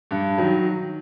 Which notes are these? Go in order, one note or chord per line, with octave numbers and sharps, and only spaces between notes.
G2
D#3 F#3